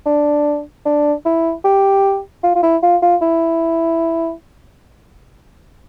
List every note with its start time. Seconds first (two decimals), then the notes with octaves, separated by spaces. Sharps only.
0.06 D4
0.86 D4
1.25 E4
1.65 G4
2.44 F4
2.55 F4
2.63 E4
2.83 F4
3.02 F4
3.22 E4